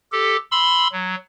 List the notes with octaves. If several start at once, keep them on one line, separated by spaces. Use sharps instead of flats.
G4 A4
B5 C6 E6
F#3